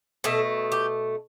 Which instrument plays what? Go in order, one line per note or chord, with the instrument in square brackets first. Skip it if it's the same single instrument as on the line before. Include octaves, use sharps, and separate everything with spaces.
[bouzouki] B2 A3 A4
G4